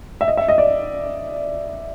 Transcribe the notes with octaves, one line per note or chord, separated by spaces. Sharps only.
E5
D#5
E5
D#5
D5